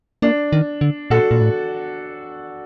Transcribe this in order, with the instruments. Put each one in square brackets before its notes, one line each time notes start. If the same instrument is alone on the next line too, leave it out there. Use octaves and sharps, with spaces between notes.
[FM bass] A#3 [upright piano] D4
[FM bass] D#3
D3
[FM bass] A#2 [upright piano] F#4 A4
[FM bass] A#2
A2